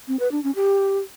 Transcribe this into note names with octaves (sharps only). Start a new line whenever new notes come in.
C4
B4
D4
C#4
G4